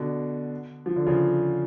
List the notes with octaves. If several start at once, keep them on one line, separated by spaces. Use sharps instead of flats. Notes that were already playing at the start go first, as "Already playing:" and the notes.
Already playing: B2 D3
F3
D3
C#3 F3